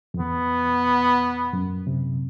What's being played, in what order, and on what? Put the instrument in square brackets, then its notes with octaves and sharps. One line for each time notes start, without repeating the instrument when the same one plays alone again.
[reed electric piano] F2
[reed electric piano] E2 [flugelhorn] B3
[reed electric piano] F#2
C3